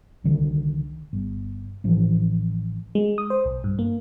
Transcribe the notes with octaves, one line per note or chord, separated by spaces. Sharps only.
C2 D3 D#3
G1
A1 E3 F3
G#3
D#6
C5
B1
G2
A#3